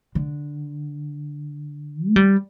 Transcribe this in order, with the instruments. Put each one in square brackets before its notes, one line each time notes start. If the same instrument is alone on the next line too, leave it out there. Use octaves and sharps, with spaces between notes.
[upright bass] D3
A3
G3